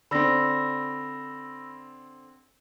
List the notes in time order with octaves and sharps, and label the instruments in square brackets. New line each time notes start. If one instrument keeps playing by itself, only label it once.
[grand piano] D3 C4 [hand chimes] B5 E6 A#6